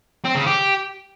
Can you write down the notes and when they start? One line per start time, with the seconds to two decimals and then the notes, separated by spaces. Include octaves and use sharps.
0.25 C4
0.36 C#3
0.47 G4